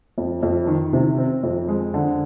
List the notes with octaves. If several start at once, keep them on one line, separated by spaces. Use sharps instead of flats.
F2
F2
D#3
C3
C4
F2
G#3
D3